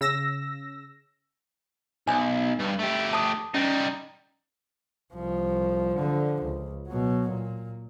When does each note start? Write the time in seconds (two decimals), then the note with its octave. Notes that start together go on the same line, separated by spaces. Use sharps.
0.01 C#3 E6 A#6
2.08 B1 G#5
2.60 G2
2.79 A3 G4
3.13 A5 D#6
3.54 G3 C#4 D#4
5.14 C2 F3
5.95 D3 F3
6.43 C#2
6.88 B2 F#3
7.28 A#2